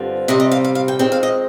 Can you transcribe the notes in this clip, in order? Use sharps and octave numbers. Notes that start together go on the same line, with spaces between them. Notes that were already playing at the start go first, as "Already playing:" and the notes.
Already playing: G2 D3 F3 C4
C3 G3 C4 D#5
D#5
F5
F5
F5
G5
F2 D#3 G#3 C4 G5
F5
D#5